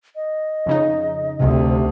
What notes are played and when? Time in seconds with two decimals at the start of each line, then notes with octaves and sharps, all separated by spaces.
0.16 D#5
0.66 F2 C#3 D#4
1.40 D2 C3